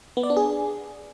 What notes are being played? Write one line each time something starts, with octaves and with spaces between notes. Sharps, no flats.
B3
D5
D4
G#4